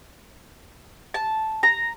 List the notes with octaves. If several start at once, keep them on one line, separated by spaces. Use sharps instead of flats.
A5
A#5